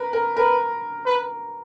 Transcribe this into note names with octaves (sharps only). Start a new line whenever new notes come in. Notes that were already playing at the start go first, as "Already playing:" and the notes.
Already playing: A#4 B4
A#4
A#4 B4
B4